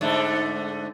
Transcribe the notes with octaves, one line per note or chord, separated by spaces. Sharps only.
G#2 D3 A3